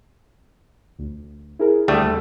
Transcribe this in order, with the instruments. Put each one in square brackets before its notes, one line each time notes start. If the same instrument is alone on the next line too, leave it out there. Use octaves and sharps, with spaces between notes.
[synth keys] D2
E4 G#4 A#4
[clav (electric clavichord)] D2 G3 A3 [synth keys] G5 C#6 D#6
[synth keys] D#2